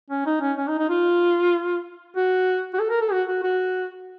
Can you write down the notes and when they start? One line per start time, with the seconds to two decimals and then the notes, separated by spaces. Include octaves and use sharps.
0.10 C#4
0.26 D#4
0.41 C#4
0.57 C#4
0.68 D#4
0.79 D#4
0.89 F4
2.16 F#4
2.73 F#4
2.79 A4
2.90 A#4
3.01 A4
3.12 F#4
3.28 F#4
3.43 F#4